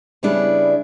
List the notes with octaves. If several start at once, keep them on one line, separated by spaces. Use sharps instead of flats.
C#3 G3 B3 D4 E4 G#4